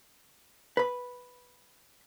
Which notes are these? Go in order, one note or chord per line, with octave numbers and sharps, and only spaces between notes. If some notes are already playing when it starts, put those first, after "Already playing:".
B4 B5